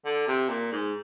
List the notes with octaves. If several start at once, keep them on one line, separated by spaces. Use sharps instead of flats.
D3
C3
A#2
G#2